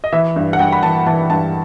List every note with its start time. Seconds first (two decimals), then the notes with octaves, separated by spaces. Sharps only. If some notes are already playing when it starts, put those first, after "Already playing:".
0.04 D#5
0.13 E3 E5
0.36 G2
0.53 F#5
0.59 G2 G5
0.72 B5
0.83 E3 A5
1.06 E3 A5
1.30 G2 A5